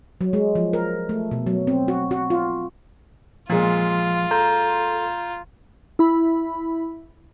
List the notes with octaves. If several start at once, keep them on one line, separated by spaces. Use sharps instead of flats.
F#3
G#3
F3
A#4
A3
B2
F#3
C4
F#4
F#4
F4
A#2 F3 G#3 F4
A4 A#5 C6 G6
E4 B5